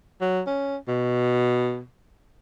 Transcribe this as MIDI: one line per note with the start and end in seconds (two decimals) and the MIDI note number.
0.21 0.41 54
0.47 0.76 61
0.88 1.82 47